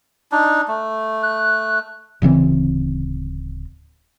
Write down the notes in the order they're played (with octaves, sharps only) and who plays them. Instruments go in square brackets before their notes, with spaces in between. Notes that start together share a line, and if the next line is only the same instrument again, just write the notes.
[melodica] D4 D#4
A3
[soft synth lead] F#6
[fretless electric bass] D1 C#3 E3 C4